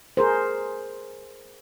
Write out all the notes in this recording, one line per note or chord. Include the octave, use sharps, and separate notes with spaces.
G#4 A#4 C5